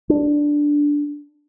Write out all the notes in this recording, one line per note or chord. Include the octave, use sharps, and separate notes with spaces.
D4